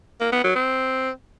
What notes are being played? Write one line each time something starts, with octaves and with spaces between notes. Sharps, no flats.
A#3
B3
F#3
C4